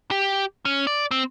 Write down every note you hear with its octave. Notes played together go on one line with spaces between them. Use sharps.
G4
C#4
D5
C4